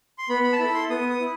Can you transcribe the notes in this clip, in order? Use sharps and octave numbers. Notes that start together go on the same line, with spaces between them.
C6
B3 B5
B5
A5
E4 A4 B5
C6
B3 D#6
D#6
E4